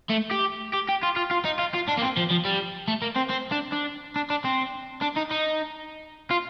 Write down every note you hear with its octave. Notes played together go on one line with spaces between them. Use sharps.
A3
G4
G4
G4
F4
F4
F4
D#4
F4
F4
D4
A#3
C4
F3
F3
G3
A3
A#3
C4
C4
D4
D4
D4
D4
C4
D4
D#4
D#4
F4